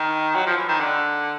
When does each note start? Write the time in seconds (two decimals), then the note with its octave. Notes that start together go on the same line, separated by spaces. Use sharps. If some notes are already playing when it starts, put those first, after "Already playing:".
Already playing: D#3
0.35 F#3
0.46 F3
0.57 E3
0.68 D#3
0.80 D3